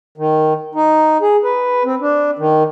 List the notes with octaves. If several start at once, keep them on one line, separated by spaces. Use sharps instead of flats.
D#3
D#4
G#4
B4
C4
D4
D#3